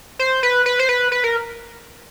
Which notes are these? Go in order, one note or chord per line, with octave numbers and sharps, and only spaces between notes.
C5
B4
B4
C5
B4
B4
A#4